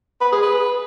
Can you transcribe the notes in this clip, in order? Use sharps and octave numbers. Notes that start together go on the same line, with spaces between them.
B4
G#4
B4